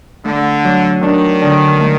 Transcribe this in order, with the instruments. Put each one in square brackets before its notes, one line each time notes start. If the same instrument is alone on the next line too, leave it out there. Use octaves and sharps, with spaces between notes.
[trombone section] D3 [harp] A3
[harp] F#3
[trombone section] D#3 [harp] D4
[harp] D3
A3